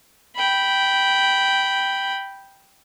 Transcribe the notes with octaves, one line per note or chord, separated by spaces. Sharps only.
G5 B5